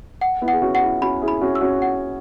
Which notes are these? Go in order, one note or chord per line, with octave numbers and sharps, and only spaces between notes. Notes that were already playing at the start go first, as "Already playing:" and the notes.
F#5
B3 E4
F#5
G#4
C#4 F#4
F#5
E4 G#4
C#4 F#4 B5
E4 G#4
B5
C#4 F#4
E6
C#4 F#4
F#5